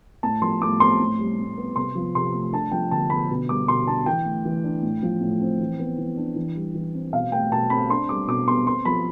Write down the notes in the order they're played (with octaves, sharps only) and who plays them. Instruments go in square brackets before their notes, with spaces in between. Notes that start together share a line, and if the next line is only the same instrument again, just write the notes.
[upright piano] A2 A5
F3 C6
A2 D6
C4 C6
A2
G3
A2
B3
C3 C6
F3
C3 C6
A3
D4 A5
F3 G5
D3 A5
B3 B5
B2
G3 D6
B2 C6
D4 A5
E3 G5
A3
E3
D4
A2
F3
A2
C4
E3
B3
E3
D4
E3
G3
E3
C4
B2 F5
A3 G5
B2 A5
C4 B5
D4 C6
G3 D6
B2 D6
B3 C6
C4 C6
F3 B5